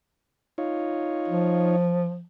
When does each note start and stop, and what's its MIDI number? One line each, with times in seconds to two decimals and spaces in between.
0.58 1.76 63
0.58 1.76 65
0.58 1.76 73
1.28 2.24 53